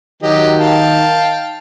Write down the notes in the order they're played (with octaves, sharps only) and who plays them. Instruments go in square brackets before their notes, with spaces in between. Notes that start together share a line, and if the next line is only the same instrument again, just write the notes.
[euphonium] D#3 [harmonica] F#3 G4 D#5
[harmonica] F5 G5 A5